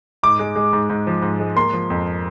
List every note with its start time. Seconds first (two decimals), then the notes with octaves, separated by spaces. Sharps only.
0.23 G#2 D6
0.39 G#3
0.56 G#3
0.73 G#2
0.90 G#2
1.07 F3
1.22 G#2
1.40 G#3
1.56 A#3 C6
1.73 F3
1.90 F2